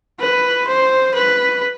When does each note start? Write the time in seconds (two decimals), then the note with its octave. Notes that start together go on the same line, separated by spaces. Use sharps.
0.20 B4
0.67 C5
1.14 B4